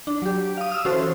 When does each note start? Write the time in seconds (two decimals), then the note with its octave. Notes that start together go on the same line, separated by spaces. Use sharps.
0.07 D4
0.22 F#3 G4
0.57 F5 D#6
0.72 E6 F6
0.85 E3 C#4 F#4 A4 C5